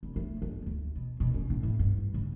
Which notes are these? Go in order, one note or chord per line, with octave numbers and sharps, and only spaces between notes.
C2
A3
G1
D2
B2
B2
C#4
A2
A2
G2
C#3